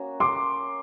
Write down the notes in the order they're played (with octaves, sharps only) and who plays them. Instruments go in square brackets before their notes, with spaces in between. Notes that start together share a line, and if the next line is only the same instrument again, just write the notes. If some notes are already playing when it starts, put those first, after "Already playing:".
Already playing: [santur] A#3 C#4 F#4
[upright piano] C6 D6